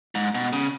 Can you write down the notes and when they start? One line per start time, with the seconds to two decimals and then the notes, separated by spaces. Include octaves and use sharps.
0.15 G#2
0.35 B2
0.53 C#3